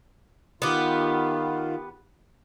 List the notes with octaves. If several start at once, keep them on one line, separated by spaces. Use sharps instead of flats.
D#3 B3 F4 G4